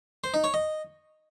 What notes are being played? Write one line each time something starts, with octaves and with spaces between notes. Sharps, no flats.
C5
D#4
C#5
D#5